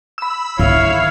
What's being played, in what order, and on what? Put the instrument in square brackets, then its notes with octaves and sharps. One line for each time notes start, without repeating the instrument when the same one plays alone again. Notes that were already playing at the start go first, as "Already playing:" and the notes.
[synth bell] B5 E6
[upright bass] D3 D#3 [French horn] E4 [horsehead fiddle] C#5 F5